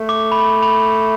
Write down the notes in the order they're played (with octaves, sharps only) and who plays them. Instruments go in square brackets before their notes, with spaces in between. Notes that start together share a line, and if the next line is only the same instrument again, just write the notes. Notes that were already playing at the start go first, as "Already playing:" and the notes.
Already playing: [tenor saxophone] A3
[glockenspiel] D6
B5
B5